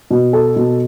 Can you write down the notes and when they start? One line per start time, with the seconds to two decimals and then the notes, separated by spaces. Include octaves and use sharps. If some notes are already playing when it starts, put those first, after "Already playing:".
0.11 B2
0.33 A4
0.56 B2